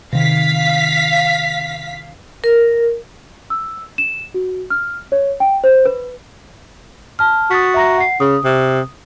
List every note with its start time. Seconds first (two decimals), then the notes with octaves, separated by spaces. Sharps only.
0.13 C3 D#3 F5 B6
2.44 A#4
3.50 E6
3.98 E7
4.34 F#4
4.70 F6
5.12 C#5
5.40 G5
5.64 C5
5.86 B4
7.19 A5 F6
7.51 F#4 D#6 A6 B6
7.74 E5 A#5 A#6
7.98 F#5 C7
8.20 C#3 D#6
8.45 C3